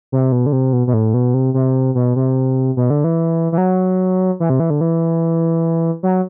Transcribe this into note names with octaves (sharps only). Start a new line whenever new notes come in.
C3
B2
D3
C3
B2
B2
A2
B2
C3
C3
B2
C3
B2
D3
E3
E3
F#3
E3
C3
E3
D3
E3
F#3